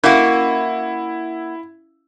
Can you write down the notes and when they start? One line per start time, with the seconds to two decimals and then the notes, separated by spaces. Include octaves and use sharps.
0.04 A#3 C#4 E4 F#4 F5